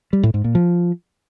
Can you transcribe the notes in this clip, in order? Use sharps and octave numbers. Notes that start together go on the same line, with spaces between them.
G3
A2
G#2
A#2
F3